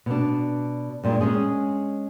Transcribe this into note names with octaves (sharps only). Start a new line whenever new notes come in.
B2 D4
G2 A#2 G#3
G#3 C#4 G#4